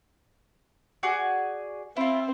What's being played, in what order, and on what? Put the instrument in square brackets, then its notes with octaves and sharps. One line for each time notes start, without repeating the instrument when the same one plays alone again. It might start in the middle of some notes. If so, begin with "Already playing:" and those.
[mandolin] F#4 G#4 D5
[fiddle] C4 [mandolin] E4 F4